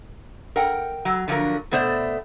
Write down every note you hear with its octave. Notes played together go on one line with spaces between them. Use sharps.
A#4 F#5 G5
F#3
D3 F3 F#3 A#4
B2 A3 B3 C5 D5